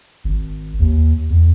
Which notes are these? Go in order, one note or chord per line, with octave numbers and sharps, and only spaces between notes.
G#1
D#2
E2